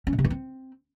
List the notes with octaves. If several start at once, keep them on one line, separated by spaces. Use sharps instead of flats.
C#4
A#2
C3
E3
C4